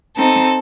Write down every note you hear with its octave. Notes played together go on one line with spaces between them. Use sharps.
C4 D#4 A4